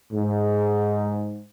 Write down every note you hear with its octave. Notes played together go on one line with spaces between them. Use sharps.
G#2